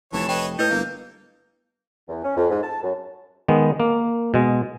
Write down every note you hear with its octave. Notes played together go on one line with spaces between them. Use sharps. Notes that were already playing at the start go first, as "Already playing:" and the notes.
F1 E3 C#5 A5
B4 C#5 D#5 G5
A2 E4 B4 D#5 G6
G1 A#3
E2
C#4
F2
G#2
A5
F#2
D#3 G#3 B3
A#3
B2 G#3